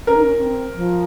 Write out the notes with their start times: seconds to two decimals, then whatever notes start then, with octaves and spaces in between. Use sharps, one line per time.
0.07 C#4 A#4
0.15 D#4
0.24 C#4
0.36 C#4
0.41 C4
0.75 F3